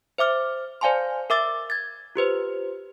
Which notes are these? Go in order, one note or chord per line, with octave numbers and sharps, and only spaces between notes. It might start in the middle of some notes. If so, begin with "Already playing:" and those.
C5 E5 D6 F6
C5 D5 F5 G#5 A5 C6
A#4 E5 D6 E6 A6
G#6 A6
F4 G4 B4 C5